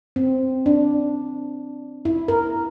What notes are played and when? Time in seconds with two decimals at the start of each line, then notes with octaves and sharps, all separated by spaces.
0.16 C4
0.66 D4
2.05 E4
2.28 A#4